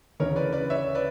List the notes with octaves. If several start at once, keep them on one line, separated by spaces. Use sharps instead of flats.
D2 C#3 E3 A#4 C#5
B4 D5
B4 D5
C#5 E5
B4 D5